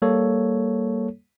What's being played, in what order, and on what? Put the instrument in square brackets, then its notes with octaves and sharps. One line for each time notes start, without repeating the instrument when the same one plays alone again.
[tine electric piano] G3 A#3 A4 C#5